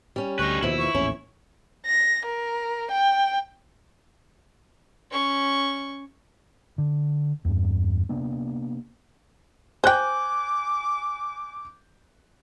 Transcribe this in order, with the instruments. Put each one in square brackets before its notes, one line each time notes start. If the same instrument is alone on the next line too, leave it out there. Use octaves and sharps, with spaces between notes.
[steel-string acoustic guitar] G3 C#4
[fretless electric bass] D2 [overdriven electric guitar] D#4 B4 [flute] C#6
[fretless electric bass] D#2 B2 [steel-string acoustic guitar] E3 F3 [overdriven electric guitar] E4
[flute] C#6
[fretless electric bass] A#1 E2 A2 [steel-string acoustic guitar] C#4
[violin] A#6
A#4
G5
[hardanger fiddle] C#4 C#6
[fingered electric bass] D3
E2 G2
C3 A#3 B3 D4
[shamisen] C5 G5 [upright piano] G#5 F#6 G6 [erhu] D6